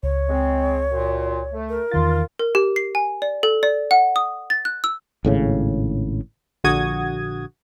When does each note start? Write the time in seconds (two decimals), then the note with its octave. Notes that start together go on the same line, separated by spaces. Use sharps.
0.03 C#2 C#5
0.29 G#3 C4
0.91 F#2 A#2
1.53 A3
1.69 A#4
1.91 E2 D#3 F4 A6
2.39 A#4
2.55 G4
2.76 C7
2.95 G#5
3.22 D5
3.43 A4
3.63 D5
3.91 F#5
4.16 D#6
4.50 A6
4.65 F#6
4.84 E6
5.25 G#1 A2 C#3
6.64 A#1 D3 F#4 D#6 G#6